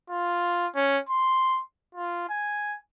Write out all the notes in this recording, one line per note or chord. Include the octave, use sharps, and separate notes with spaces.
F4
C#4
C6
F4
G#5